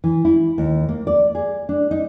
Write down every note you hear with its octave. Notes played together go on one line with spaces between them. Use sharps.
E3
E4
D#2
A#3
D5
G#4
D4
D#4